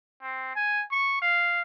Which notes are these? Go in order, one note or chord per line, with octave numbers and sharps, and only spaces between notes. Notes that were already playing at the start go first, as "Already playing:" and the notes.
C4
G#5
C#6
F5